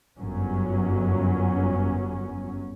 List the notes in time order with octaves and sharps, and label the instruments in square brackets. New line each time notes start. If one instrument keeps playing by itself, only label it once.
[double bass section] G1 F#2 F#3 C#4